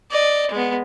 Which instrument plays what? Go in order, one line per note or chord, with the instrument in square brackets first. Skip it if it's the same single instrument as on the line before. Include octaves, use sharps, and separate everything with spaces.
[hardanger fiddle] D5 D#5
G#3 B3